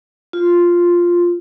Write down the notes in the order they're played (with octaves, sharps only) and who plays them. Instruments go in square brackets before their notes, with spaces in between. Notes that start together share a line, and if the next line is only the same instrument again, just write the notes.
[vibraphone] F4